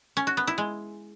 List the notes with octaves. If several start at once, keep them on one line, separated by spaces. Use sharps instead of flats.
C#4
F#4
B3
E4
G#3